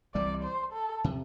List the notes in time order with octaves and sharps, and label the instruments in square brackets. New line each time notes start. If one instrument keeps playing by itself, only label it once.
[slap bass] C2 C3 E3 G3 [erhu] D5
[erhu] C5
A4
[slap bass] C3